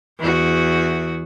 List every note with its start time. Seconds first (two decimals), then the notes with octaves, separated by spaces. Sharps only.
0.19 E2 F#4